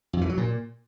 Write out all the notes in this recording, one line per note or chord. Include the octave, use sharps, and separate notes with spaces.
F2
E3
F#3
A#2